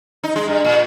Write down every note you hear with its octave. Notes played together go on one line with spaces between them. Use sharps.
D#4
G#3
G2
A#2